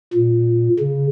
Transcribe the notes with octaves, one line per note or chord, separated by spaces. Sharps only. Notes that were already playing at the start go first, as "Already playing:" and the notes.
A#2
C#3